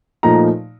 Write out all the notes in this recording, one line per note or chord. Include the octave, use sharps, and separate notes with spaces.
A#2 F3 A3 D#4 A#5